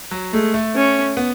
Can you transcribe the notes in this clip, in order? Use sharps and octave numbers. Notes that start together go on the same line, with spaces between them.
F#3
G#3 A3
A3
C#4
B3